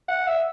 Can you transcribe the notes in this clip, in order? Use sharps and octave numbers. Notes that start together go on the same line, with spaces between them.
F#5
E5